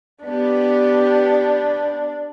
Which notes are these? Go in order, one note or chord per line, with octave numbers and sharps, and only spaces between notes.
B3 D4 G4